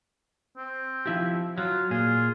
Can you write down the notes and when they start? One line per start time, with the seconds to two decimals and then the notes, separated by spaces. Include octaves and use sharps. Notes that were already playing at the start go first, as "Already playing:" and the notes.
0.57 C4
1.06 F3 E4 G4
1.58 F#3 F4
1.90 A#2 F4 G#4